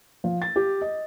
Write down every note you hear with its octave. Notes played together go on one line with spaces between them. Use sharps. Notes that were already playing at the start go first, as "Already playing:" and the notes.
F3
A6
G4
D#5